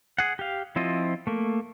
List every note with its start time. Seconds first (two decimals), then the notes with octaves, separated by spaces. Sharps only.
0.18 G#4 F#5
0.39 G4 F5
0.76 F3 C4 E4 F4 D#5
1.27 A3 A#3